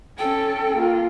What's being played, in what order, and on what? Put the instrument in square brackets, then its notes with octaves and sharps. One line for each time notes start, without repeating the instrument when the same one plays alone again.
[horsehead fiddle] C#4 A4 [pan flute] G5
[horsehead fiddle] A#3 F4